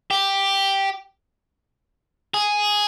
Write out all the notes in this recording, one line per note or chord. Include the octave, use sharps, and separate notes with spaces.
G4
G#4